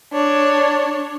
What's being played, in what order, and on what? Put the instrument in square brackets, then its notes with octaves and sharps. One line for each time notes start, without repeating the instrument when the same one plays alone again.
[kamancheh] D4 C#5